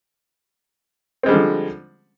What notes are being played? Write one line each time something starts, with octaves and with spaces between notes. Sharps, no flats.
D3 F3 G3 G#3 C4